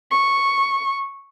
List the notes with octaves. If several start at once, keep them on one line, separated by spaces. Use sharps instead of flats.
C#6